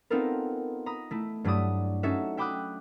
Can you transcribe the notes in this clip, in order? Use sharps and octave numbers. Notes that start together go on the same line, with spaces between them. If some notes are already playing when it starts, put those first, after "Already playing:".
B3 C4 D#4 F4 A4 A#4
A#5 B5 D#6
A3 E4
G2 F#3 A3 E4 D5 D#6
C#4 D#4 F#4 A4 E5
E5 G5 B5 D6 D#6 F#6